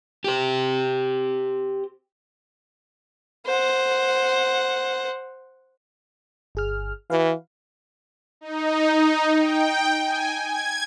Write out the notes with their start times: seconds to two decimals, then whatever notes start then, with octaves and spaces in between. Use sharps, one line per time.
0.24 G4 C5
3.46 C5 F#5
6.55 G1 G#4 F6
7.10 E3 F#4 B4 F5
8.41 D#4
8.91 D#4
9.38 G5
10.04 G#5
10.43 G#6